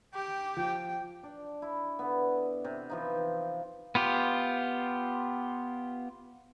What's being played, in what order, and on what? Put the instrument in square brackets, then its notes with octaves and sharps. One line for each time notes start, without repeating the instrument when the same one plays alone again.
[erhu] G4 [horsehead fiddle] G5
[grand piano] F3 [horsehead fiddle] G5
[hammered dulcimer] D4
E4
D3 B3
C3
E3 F3 D#4
[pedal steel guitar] B3 F4 G4